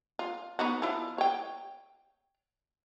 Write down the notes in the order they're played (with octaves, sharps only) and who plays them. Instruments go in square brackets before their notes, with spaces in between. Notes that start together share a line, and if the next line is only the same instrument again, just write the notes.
[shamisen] F4
B3 D#4 F#4
F3 E4
C#5 G5